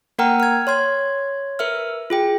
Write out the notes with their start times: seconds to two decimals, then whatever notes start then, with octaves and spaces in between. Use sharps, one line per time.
0.19 A#3 A#4 F#5 G5 A#5 F6
0.40 F6 G#6
0.67 C#5 C6 G#6
1.59 A#4 B4 E5 F6
2.10 F4 G#4 G5